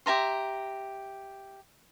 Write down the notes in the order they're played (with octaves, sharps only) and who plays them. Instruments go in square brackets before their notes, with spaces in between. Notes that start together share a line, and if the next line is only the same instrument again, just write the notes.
[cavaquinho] G4 E5 A#5 C6